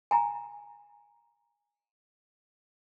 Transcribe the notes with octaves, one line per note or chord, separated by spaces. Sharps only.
G#5 A#5